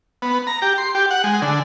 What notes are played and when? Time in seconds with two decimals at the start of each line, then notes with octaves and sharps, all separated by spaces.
0.22 B3
0.47 A#5
0.62 G4
0.78 C6
0.95 G4
1.11 F#5
1.24 G#3
1.42 D3